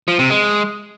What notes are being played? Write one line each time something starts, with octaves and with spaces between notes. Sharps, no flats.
F3
C3
G#3